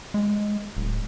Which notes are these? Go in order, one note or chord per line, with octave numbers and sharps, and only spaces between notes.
G#3
D1